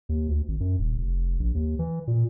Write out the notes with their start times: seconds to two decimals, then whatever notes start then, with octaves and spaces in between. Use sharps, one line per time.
0.09 D#2
0.28 D2
0.48 G#1
0.60 F#2
0.79 D#1
0.98 F1
1.40 A#1
1.55 D#2
1.79 E3
2.07 A#2